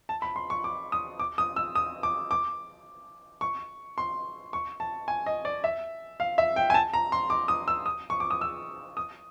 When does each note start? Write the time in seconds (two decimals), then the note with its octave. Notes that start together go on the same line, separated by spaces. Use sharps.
0.09 A5
0.22 B5
0.36 C6
0.50 C#6
0.64 D6
0.92 D#6
1.19 D6
1.38 D#6
1.56 E6
1.75 D#6
2.03 D6
2.31 D6
3.41 C#6
3.98 C6
4.53 C#6
4.80 A5
5.08 G#5
5.26 D#5
5.45 D5
5.64 E5
6.20 F5
6.38 E5
6.56 G5
6.70 G#5
6.74 A5
6.93 A#5
7.12 C6
7.30 D6
7.48 D#6
7.68 E6
7.86 D#6
8.10 C#6
8.20 D6
8.31 D#6
8.41 E6
8.97 D#6